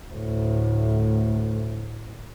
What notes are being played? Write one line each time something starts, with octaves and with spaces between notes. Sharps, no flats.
D2 A2